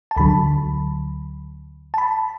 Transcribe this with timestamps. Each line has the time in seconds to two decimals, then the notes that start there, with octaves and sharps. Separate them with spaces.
0.11 A5
0.17 D2 D3 F#3 B5
1.94 A5
1.98 B5